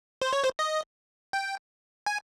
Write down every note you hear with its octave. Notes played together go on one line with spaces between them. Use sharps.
C5
C#5
C5
D#5
G5
G#5